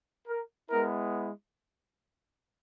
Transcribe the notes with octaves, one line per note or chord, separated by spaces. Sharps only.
A#4
G#3 B3 E4 A#4